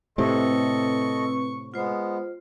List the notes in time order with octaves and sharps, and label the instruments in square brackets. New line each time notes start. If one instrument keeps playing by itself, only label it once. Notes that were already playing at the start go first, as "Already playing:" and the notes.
[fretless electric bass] A2 C3 [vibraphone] C4 B4 [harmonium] A4 D#5 [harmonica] C#6
[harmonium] G#3 B3 [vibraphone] F4 C5